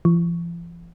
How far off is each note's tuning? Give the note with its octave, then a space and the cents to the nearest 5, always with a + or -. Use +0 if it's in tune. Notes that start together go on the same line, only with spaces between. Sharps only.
F3 -45